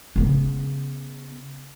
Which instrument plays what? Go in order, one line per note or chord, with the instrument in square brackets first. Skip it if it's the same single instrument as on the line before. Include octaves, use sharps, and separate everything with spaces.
[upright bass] C#3 B3